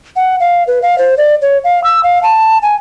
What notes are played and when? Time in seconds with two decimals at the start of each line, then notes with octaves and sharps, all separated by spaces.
0.16 F#5
0.40 F5
0.67 B4
0.82 F5
0.98 C5
1.17 D5
1.42 C#5
1.64 F5
1.84 E6
2.03 F5
2.23 A5
2.62 G#5